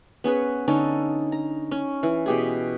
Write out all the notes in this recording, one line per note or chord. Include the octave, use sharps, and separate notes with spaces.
B3 C#4 G#4 B4
D3 C#4 D#4 A4
A#5
C#4
E3
B2 G4 G#4